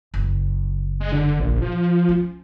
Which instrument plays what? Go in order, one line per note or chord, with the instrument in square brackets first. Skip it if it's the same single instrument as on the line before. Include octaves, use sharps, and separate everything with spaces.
[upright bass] F#1 C#3
[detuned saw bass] G#3
D3
A#1
F3
[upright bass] C#4